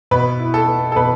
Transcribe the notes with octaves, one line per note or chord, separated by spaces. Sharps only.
B2 B4
E4
A4
B3
A4
B2 B4